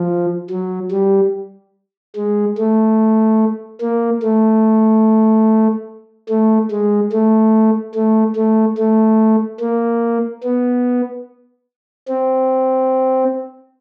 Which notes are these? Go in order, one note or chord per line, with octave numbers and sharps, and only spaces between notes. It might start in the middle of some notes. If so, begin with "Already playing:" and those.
Already playing: F3
F#3
G3
G#3
A3
A#3
A3
A3
G#3
A3
A3
A3
A3
A#3
B3
C4